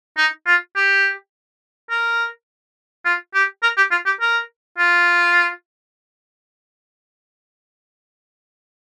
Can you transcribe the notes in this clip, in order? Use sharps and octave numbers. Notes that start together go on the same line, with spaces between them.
D#4
F4
G4
A#4
F4
G4
A#4
G4
F4
G4
A#4
F4